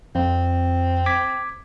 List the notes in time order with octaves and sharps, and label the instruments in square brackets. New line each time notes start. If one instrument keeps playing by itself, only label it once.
[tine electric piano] F2 [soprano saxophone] C4
[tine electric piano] D6 G#6 B6